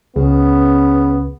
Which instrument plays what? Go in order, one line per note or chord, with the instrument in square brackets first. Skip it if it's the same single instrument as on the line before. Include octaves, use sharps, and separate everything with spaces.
[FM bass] C#2 [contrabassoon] C#3 [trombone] B3